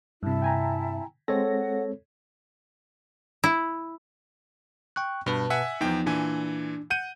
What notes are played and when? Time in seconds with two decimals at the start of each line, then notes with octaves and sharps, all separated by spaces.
0.23 G2 C3 E4 E5 A5
0.42 G5 G#5 A#5
1.28 G#3 C4 A4 C#5 F#5 A#6
3.44 E4
4.96 G5 C#6 F#6
5.26 G2 B2 B4 A5
5.50 E5 F#5 G#5
5.81 E2 F3 B3 D#4 G5
6.06 A#2 E3 D4 G#5
6.90 F#5 G6 D#7